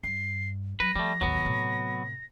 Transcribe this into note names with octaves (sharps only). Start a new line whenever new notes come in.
G2 C7
F#3 B4 A#6
F3 G3 A3
A1 D#2 F#3 B3
A2 C3